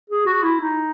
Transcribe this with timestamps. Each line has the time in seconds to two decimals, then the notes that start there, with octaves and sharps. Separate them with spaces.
0.10 G#4
0.26 F#4
0.43 E4
0.60 D#4